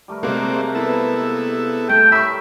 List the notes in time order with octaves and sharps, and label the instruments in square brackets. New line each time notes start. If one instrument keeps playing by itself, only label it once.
[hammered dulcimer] G3 A3 A#4
[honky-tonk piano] C3 G#3 A#3 [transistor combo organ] C4 F#4 D5
[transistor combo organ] B3 E4 A4 [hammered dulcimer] B4 E5
[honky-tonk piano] A3 A4 [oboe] G5
[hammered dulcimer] G4 A#4 C#5 [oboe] E5 [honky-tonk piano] B5 C#6